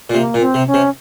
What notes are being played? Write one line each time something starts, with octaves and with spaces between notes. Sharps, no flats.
A#2
C3 A#3
A#2
C4
C3
C#4
C3